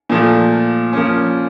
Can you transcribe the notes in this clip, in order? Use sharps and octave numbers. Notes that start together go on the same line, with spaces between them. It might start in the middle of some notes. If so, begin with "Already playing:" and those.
A#2 F3 A3
F3 A#3 C#4